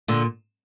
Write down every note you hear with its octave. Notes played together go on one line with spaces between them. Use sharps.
A#2 D3